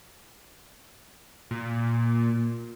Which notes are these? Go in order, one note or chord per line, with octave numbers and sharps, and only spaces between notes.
A#2